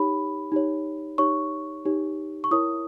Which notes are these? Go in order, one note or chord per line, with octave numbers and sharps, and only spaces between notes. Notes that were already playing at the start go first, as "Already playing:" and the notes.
Already playing: D#4 G4 C#5 B5
D#4 G4 C#5
D#4 G4 C#5 C#6
D#4 G4 C#5
C#6
E4 A#4 C#5 D#6